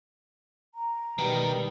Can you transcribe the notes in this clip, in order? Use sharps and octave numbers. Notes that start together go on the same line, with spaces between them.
A#5
B2 D#3 G3